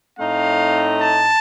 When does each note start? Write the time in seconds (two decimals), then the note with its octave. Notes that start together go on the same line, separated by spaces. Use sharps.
0.19 A2 A3 C4 D#4 F5
1.02 A5